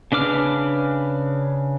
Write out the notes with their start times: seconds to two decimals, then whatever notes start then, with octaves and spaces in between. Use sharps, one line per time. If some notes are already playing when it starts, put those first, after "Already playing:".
0.12 C#3 D4 B4 D6 F6